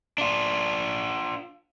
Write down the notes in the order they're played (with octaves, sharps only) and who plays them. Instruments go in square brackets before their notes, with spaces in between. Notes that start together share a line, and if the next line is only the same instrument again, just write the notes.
[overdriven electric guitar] D4 F4